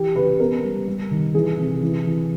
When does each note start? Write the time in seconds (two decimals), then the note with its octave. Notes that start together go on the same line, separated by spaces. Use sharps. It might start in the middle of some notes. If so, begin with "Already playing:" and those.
Already playing: E3 G4
0.15 C#3 B4
0.39 B3 A#4
0.63 G3
0.87 G3
1.11 D#3
1.34 E3 G#4
1.58 C3
1.82 E3
2.05 E3